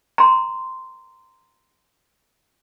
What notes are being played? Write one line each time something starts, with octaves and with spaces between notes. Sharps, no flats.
A#5 C6